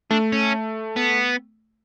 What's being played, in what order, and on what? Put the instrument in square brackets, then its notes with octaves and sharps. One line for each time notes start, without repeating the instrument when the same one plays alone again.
[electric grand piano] A3 [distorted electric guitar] D4
[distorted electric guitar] C#4
B3